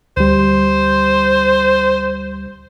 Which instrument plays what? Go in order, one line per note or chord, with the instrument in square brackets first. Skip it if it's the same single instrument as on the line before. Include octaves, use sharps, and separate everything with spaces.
[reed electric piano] D2 G3 [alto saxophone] C5